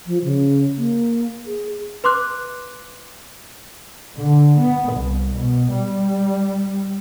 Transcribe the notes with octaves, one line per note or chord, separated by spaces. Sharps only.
F3
C#3
A#3
G#4
B4 C6 D6 F#6
D3
B3
C2
B2
G3